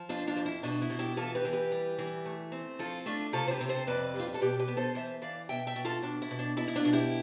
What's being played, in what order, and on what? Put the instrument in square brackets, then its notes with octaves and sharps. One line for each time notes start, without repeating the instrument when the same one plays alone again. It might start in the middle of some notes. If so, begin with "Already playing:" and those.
Already playing: [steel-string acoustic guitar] F3
F2 D4 F4
D4 F4
F2
E4
B2 D4
E4
B2
E4 G4
E3 F4 A4
G4 B4
E3
G4 B4
G3
E3
A3
C4
F3 F4 A4
A3 D4 F4
C3 F4 A4
C5
G4 B4
C3
A4 C5
F2 B4 D5
G3 F4
G4
A4
B2 G4 B4
G4 B4
B3
A4 C5
E3 C5 E5
E3 D5 F5
B2 E5 G5
E5 G5
B2
F4 A4
B2 D4
E4
B2
D4
B2 E4
E4
D4 F4
B2
E4 G4